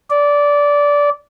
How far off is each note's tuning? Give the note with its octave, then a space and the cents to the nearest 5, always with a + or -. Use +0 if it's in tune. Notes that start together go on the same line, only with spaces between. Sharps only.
D5 -15